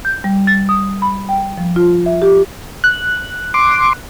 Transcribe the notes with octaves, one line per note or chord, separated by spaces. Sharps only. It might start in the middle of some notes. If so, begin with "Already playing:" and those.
G6
G3
A6
D#6
B5
G5
F3
F4
E5
G4
F#6
C6 D6